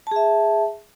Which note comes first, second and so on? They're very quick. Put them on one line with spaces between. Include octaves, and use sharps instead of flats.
A5 G#4 E5